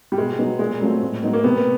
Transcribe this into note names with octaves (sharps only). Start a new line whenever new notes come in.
G3
B2 G#3
F#3 B3 D#4
A#2 G#3
F#3 A3 C4 F4
A2
F#3 B3 D#4
A#3
C3 B3